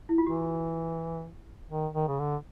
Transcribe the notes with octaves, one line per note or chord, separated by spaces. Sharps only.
E4
F4
E3 F#4
D#3
D#3
C#3
D3